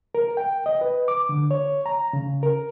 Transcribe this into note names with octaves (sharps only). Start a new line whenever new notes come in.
A#4
G5
D#5
B4
D6
D3
C#5
A#5
C#3
A#4